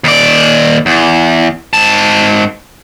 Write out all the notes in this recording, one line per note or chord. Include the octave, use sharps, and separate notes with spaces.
D#2 D5
E2
G#2 A5